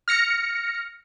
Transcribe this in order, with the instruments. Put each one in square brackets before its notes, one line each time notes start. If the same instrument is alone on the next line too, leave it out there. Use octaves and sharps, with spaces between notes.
[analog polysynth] F6 A#6 C#7